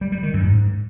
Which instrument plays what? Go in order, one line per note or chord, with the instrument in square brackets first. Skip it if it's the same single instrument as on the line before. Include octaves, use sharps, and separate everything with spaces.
[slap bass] G3
G3
D#3
F#2
G#2